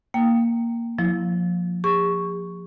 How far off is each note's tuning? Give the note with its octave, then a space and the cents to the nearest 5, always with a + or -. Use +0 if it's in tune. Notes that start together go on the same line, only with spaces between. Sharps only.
A#3 +0 G5 -5
F3 +25 E4 +0
G#4 -45 C#6 +0